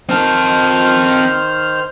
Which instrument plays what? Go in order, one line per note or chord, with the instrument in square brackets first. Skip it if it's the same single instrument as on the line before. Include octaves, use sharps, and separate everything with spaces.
[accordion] D#3 C5 F6 [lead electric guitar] C4 A5